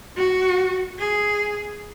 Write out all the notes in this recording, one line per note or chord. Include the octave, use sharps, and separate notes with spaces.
F#4
G#4